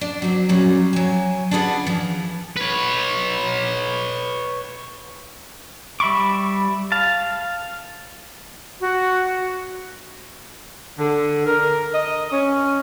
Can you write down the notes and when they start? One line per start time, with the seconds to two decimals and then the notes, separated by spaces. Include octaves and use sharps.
0.01 D4
0.22 F#3 C4
0.49 A#2 C#3 F#3 G3
0.93 F#3 G#5
1.51 D4 E4 F4 G#4 B4 F#5
1.87 E3 F3
2.57 B4 C#5
6.00 G3 E5 B5 C#6 D6
6.92 F5 A5
8.81 F#4
10.98 D3
11.46 A#4
11.94 D#5
12.32 C#4